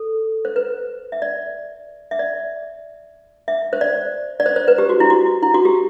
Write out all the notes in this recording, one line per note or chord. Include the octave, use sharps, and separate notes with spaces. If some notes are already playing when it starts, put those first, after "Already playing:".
Already playing: A4
C5
B4
E5
D5
E5
D5
E5
C5
D5
D5
C5
C5
B4
G4
F#4
E4
F#4
E4
F#4
G4